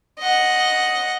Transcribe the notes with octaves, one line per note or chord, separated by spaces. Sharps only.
D#5 F#5